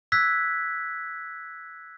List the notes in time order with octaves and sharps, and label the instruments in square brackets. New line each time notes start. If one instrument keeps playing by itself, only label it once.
[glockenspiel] E6 F#6 G#6 B6